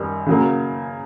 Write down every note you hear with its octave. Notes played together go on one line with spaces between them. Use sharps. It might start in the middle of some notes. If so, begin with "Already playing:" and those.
Already playing: F#2 D#3 G3
C#3 F#3 A#3